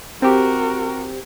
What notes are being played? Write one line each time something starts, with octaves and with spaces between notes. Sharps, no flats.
C4 F#4 G4 A#4